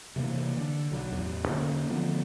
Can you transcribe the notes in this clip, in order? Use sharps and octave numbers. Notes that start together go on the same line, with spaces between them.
C3 E3 G3 A#3
D3
B1 F#3
A1 E2
D3 A#3 C#4
D3 F3 A3 B3